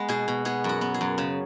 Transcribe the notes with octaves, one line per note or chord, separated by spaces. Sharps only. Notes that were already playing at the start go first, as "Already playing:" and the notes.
Already playing: G#3 B3 B4
B2 G#4
B2
B3 G#4
F#2 F#4
B3
G#4
F#2
C#3